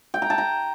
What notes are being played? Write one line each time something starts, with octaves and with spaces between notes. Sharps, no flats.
G5
A#5
A5
A#5